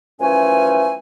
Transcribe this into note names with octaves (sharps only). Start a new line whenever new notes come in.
F#2 E3 F3 A3 C#4 G#5